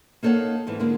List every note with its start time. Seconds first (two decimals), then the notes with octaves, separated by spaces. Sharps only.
0.23 A#3 D#4 A4 C#5 F5 F#5
0.67 E2 G#2 E3
0.79 D3 G#3 A#3